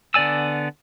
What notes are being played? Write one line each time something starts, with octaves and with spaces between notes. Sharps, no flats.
D3 B3 D5 G#5 E6